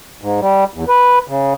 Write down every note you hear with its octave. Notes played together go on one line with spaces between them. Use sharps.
G#2
G3
E2
B4
C#3